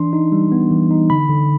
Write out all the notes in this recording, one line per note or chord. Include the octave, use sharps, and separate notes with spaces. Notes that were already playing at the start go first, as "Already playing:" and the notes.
Already playing: E3 D4 C6
D#4
G3
B3
E3
D#4
D3 B5
D3